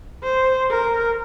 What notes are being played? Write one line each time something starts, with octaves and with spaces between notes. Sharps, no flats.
C5
A#4